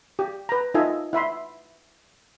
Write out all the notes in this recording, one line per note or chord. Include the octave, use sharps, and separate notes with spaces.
G4
B4 A#5
D#4 F4 A4 D#5 E5 G#5
E4 E5 B5 C6